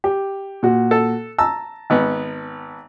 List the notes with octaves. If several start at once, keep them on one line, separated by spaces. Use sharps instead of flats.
G4
A#2 F#4
A4
A5 A#5 E6
G#1 B3